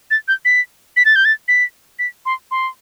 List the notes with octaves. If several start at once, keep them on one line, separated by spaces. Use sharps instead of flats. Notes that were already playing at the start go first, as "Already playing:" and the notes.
A6
G6
B6
B6
A6
G6
A6
B6
B6
C6
C6